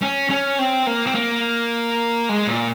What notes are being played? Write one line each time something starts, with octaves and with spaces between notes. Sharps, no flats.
C#4
C#4
C4
A#3
C4
A#3
G#3
A#2